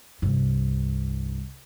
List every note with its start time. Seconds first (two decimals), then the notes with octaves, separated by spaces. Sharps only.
0.22 C2 G2